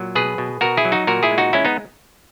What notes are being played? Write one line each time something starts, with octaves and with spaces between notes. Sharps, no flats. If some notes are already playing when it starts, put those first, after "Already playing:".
Already playing: A#2 F#3
B2 G#4 B4
B2
B2 F#4 A#4
E4 G#4
F#3
D#4 F#4
A#2 F#4 A#4
E4 G#4
G#3
D#4 F#4
G#3 C#4 E4
B3 D#4